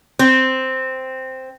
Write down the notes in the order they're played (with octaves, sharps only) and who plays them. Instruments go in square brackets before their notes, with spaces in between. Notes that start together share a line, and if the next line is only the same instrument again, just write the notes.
[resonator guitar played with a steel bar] C4